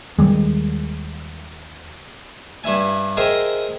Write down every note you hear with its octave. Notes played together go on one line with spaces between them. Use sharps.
D#2 D#3 G3 G#3
G2 E4 E5 G#5
G#4 A#4 C5 D#5 E5 G5